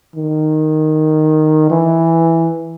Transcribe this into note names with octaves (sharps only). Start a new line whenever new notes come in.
D#3
E3